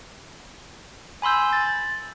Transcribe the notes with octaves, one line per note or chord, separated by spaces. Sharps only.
G#5 B5 C6 E6 G6
A6